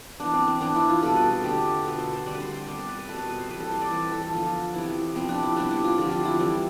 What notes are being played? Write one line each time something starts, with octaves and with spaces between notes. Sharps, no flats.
E3 B3 D4
C4
C4
E3 B3 D4
E4
F4
B2 G3 C4 A4
B4
A4
D3 A3 C4 G4
B2 B3 A4
C5
C5
D3 G3 C4 D5
B4
C5
C5
C3 G3 B3 D5
C5
B4
B4
B2 G3 C4 A4
B4
B4
C5
C3 E3 G3 B4
A4
C5
D5
E3 G3 C4 C5
B4
A4
A4
D3 F3 B3 F4
C3 E3 B3 E4
C3 F3 B3 C4
D4
E4
C3 G3 B3 D4
E4
F4
D3 F3 C4 G4
F4
E4
E3 G3 C4